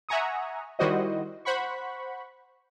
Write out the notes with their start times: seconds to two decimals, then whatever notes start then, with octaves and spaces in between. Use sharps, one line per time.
0.09 E5 F#5 G#5 A#5 C#6 D#6
0.79 D#3 G3 E4 F#4 C5 D#5
1.45 C5 F#5 B5 C#6